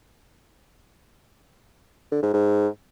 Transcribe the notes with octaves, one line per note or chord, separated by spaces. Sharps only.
D3
G#2
G#2